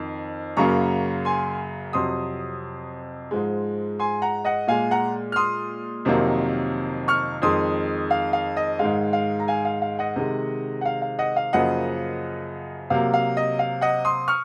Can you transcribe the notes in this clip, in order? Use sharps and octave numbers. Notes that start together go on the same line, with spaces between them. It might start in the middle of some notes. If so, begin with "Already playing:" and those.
Already playing: F2 D#3
F#2 C#3 F#3 A#3 A#5 C#6
G#5 C6
F2 C3 F#3 C6 D#6
G#2 F3 G#3
G#5 C6
F#5 A#5
D#5 F#5
A#2 G#3 F5 G#5
F#5 A#5
F6
C6 D#6
F2 C3 D#3 F#3 A#3
C#6 F6
F2 D#3 G#3 C6 D#6
F5
F5
D#5
G#2 D#3 G#3 F5
F5
A#5
F5 G#5
F5
F5
D#5 F#5
C3 D#3 G#3
F#5
F5
F5
D#5 F#5
F5
F#2 C#3 F3 A#3 D#5 F#5
C3 F#3 A#3 F5
F5
D#5
F5
D#5 F#5
C6 D#6
C#6 F6